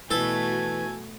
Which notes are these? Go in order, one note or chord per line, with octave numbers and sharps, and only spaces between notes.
B2 E3 A3 F#4 A4 G#5